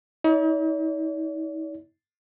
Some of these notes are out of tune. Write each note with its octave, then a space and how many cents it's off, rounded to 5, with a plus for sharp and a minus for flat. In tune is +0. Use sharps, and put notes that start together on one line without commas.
D#4 +45 D5 -45